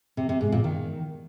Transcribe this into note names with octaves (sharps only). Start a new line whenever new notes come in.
C3
C3
G#2
A#2
D#3